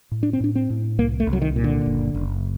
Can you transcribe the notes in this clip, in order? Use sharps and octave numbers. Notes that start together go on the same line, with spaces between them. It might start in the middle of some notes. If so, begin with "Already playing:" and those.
A2
D4
C4
A2 D4
C4
A2
C2 A#3
A3
C2
F#3
D#3
A#2
D3
F#1
F#1